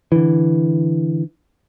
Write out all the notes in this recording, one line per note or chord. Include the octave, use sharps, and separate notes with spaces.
D3 E3